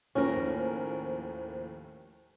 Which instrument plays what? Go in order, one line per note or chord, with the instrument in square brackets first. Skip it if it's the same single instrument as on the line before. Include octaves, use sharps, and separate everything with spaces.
[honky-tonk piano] D#2 A2 F3 [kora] C#4 A#4